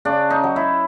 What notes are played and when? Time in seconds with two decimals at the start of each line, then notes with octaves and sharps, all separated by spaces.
0.05 C#3 D4
0.30 D#4
0.44 F#3
0.56 E4